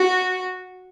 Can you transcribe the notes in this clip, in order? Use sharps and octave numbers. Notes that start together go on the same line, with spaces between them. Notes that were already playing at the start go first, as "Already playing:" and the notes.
Already playing: F#4